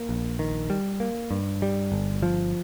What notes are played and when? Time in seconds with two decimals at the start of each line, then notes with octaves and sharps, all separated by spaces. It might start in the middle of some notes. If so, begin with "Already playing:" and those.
Already playing: A#3
0.09 A#1
0.39 D#3
0.70 G3
1.00 A#3
1.31 G2
1.62 G3
1.92 G1
2.23 F3